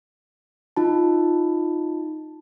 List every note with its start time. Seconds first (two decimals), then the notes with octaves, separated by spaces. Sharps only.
0.77 D#4 F4 A5